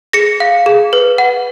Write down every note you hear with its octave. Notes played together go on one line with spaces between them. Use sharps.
G#4 A#6 C#7
F5
G#4
B4
F#5